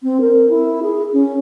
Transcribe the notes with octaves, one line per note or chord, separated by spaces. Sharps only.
C4
A#4
E4
G#4
C#4